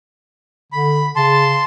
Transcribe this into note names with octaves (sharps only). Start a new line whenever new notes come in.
D3 B5
C#3 A5 C6